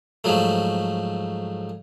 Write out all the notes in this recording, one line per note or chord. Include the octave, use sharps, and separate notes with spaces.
G#2 F3 F#3 A3